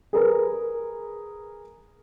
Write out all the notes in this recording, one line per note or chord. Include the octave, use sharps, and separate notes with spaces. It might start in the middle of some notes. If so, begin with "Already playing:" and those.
G#4 A#4 B4